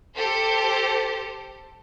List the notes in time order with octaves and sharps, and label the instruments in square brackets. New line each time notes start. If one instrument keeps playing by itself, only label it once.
[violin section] G4 A4 C5